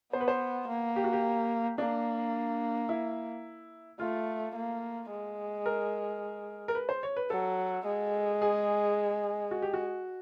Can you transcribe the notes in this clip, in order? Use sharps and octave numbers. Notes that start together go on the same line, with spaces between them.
B3 C5
B4
C5
A#3
G4
F#4
G4
A#3 D4
E4
A3 F4
A#3
G#3
A#4
A#4
B4
C5
C#5
B4
F#3 A4
G#3
G#4
F#4
G4
F#4